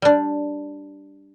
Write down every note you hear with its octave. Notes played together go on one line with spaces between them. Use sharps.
G3 D4